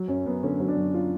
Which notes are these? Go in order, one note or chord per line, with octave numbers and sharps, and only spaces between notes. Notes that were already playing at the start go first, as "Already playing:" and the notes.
Already playing: F#3
F#2 C#4
F#2 B3
D3 C#4
F#3
D4
F#2
F4